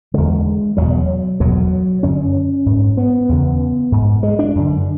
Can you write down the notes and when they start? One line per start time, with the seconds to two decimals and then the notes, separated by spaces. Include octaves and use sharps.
0.14 E2 D3 G#3
0.77 E2 B2 F#3
1.40 E2 B2 F#3
2.03 F#2 D3 C#4
2.66 G#2
2.97 B3
3.29 E2 C#3
3.92 G#2
4.23 G#3
4.39 D4
4.55 F#2 D3